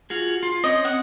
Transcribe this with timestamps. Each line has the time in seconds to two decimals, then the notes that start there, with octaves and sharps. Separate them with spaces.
0.10 F4 F#4 G#4
0.43 F4
0.64 C4 C#4 D#5
0.85 F#5